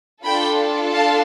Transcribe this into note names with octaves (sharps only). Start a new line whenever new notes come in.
D4 F4 A4 G5 B5
F5 A5